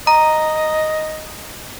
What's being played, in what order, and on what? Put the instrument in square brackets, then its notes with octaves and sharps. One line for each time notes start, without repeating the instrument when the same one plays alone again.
[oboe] D#5 [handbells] A#5